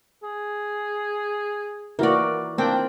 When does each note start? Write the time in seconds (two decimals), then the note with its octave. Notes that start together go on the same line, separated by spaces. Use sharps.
0.23 G#4
1.99 E3 A#3 F#4 A#4 D5
2.58 A#3 C4 D4 G5